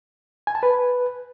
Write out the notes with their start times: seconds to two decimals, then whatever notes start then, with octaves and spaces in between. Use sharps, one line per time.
0.47 G#5
0.55 A5
0.63 B4